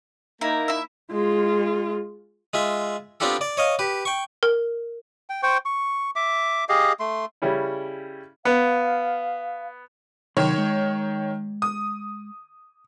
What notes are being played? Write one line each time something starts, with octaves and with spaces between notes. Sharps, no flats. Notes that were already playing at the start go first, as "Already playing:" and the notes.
A#3 D#4 E4 A#5
E4 E5
G#3 F4
G#3 F4 E5
B3 C4 D4 F4 G4 A4
D5
C#5 D#5 F5
G4 B4
G5 C#6
A#4
G5
C5 G5 C#6
C#6
E5 D6
G4 G#4 D#5 F5
A3 C6
C#3 G3 C#4 E4
B3 F5
C3 D#3 F#3 C#5 C6
G#3
D#6